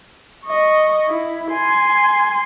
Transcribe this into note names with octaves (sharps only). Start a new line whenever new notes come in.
D#5 C#6
E4
G#5 C6